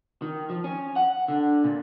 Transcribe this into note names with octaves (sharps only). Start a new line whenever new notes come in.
D#3
F3
C#4
F#5
D3
A#2